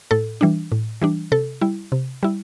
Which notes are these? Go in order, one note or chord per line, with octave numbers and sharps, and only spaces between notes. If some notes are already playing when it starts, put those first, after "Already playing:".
A2 A4
E3 G3 D4
A2
E3 G3 D4
C3 A4
G3 E4
C3
G3 E4